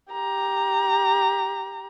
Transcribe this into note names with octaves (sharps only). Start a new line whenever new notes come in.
G4 A#5